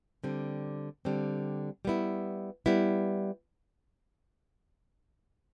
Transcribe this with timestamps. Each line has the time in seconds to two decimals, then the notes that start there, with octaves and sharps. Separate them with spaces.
0.23 D3 G3 C4
1.05 D3 G3 C4
1.85 G3 B3 E4
2.66 G3 B3 E4